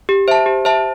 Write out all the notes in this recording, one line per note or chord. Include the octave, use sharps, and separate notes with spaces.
G4
C5 E5 A5
G4
C5 E5 A5